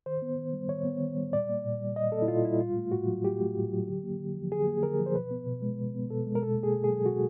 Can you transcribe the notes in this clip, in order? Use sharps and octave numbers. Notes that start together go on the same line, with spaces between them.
D#3 C5
B3
D#3
G3
D#3 C#5
B3
D#3
G3
A#2 D5
A#3
A#2
G3
A#2 D#5
A#3 A4
E4
A#2 F4
G3 E4
A2 F4
A3
A2 F#4
F#3
A2 G4
A3
A2
F#3
D3
A#3
D3
F3
D3 G#4
A#3
D3 A#4
F3
C5
B2 B4
B3
B2
G#3
B2
B3
B2 A4
G#3
A#4
B2 A4
A#3
G#4
B2
G#4
F#3
B2 F#4